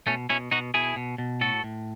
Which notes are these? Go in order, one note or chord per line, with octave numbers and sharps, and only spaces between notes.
B2 A3 C#4
B2 C#4 E4
B2 D#4 F#4
B2 E4 G#4
B2
B2
A2 F#4 A4
A2